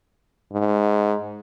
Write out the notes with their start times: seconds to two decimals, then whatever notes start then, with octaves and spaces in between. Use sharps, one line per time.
0.53 G#2